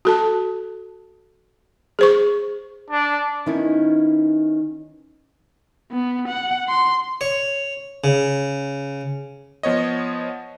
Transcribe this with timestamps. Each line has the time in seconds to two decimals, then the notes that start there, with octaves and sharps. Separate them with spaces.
0.05 F#4 A4 A5
1.99 G#4 C5 C#6
2.90 D4
3.46 D#3 B3 C#4 D#4 E4
5.91 B3
6.28 F#5
6.69 C6
7.21 C#5
8.04 C#3
9.63 F3 B3 C#5 D#5